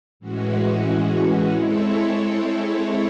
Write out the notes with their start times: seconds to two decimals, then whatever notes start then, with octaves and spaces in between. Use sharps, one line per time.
0.20 A2 E3 G#3 C#4 F#4
1.52 G#3 C4 E4 A4 C#5